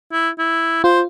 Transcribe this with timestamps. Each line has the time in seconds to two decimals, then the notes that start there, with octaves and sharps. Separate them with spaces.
0.12 E4
0.38 E4
0.84 F4 C5